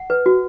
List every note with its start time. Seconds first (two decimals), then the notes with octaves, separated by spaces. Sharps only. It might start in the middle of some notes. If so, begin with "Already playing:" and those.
Already playing: F#5
0.10 B4
0.26 F#4